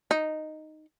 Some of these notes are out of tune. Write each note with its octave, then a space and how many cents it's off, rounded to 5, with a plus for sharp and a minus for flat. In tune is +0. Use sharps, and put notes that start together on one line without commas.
D#4 -5